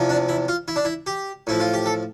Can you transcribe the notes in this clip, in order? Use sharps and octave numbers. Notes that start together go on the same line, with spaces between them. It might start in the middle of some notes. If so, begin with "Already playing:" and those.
Already playing: E2 C3 F3
D4
E4
F4
E4
D4
E4
G4
A2 F3 E4
F4
G4
A4